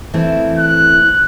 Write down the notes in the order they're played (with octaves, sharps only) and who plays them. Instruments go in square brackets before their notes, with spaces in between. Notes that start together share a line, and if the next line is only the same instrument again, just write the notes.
[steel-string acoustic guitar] E3 A3 C4
[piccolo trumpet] F#6